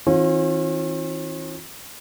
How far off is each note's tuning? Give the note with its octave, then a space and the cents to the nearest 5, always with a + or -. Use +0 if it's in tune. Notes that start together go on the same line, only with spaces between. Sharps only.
E3 -35 C#4 -45 F4 +30